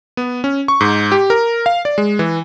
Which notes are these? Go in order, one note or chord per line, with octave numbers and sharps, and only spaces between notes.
B3
C#4
C#6
G#2
G4
A#4
F5
D5
G#3
E3